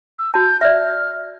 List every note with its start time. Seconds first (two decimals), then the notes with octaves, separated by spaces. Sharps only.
0.19 E6
0.34 F#4 A5 G6
0.61 D5 E5 F6